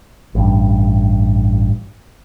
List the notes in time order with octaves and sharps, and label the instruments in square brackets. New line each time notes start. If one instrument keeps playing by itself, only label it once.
[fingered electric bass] A1 G2